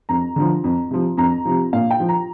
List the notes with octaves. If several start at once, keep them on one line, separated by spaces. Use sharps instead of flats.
F2 A#5
D3 F3
F2
C3 F3
F2 A#5
C3 F3
A#2 F5
G5
F3
A#5